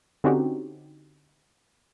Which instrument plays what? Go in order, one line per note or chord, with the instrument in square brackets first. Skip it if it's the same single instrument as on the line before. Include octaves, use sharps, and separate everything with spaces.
[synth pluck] D3 C4 C#4 D#4 F#4 G4